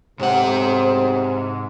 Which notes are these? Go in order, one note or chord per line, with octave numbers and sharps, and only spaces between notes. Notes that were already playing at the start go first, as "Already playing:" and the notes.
B1 G#2 C3 C5 F#5